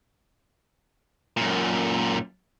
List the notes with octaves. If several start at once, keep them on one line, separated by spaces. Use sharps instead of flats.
F#2 A#2